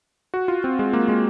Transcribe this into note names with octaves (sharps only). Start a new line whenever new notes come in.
F#4
F4
C4
G#3
A#3
G#3